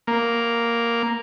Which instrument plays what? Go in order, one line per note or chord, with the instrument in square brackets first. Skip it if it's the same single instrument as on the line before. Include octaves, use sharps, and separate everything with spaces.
[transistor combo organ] A#3